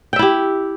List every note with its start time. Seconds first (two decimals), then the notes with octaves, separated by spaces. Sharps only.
0.13 G5
0.16 E5
0.19 E4
0.22 G4